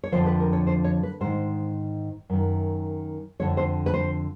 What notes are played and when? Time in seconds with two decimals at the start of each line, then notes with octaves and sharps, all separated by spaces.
0.04 C#5
0.12 F2 D3 F3 C5
0.26 B4
0.40 A#4
0.53 C#5
0.67 C5
0.84 C#5
1.03 B4
1.21 G#2 D#3 C5
2.30 F#2 D#3
3.39 F2 D3 F3 C#5
3.57 C5
3.86 B4
3.94 C5